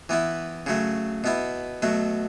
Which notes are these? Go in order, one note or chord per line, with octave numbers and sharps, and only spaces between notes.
E3 B3 E4
C#3 F#3 A3
B2 B3 E4
B2 F#3 A3